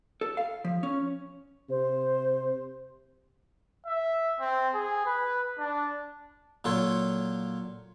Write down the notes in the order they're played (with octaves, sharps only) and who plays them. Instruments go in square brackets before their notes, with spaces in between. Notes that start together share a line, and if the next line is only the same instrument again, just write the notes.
[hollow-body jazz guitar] A4
F5
F3
C#4
[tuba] C3 [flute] C5
[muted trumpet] E5
C4
G#4
B4
D4
[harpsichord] A#2 F#3 A4 C#5 C6